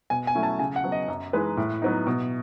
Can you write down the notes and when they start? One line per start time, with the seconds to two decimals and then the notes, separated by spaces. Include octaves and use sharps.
0.10 B2 G#5
0.27 G#5
0.35 F#3 A3 C#4 E4
0.43 A5
0.59 C#3 G#5
0.76 F#5
0.84 F#3 B3
0.92 D#5
1.08 F#2
1.33 E3 G#3 D#4 B4
1.57 A2
1.82 F#3 B3 D#4
2.07 B2